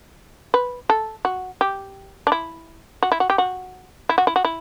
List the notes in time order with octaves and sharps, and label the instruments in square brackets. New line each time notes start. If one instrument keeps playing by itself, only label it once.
[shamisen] B4
A4
F#4
G4
D4
E4
F#4
E4
F#4
G4
F#4
E4
F#4
E4
F#4
E4